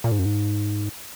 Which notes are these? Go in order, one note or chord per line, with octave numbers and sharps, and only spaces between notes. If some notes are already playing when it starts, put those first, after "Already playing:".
A#2
G#2
F#2
G#2